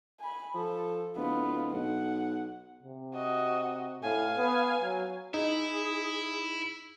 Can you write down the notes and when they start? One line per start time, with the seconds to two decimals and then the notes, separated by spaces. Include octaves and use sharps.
0.20 G#5 B5
0.55 F3 A4
1.16 D1 B3 F4
1.73 B1 F#5
2.83 C3
3.14 F#4 D#5
4.02 A2 F5 G#5
4.37 B3
4.82 F#3
5.34 D#4 E4 G#4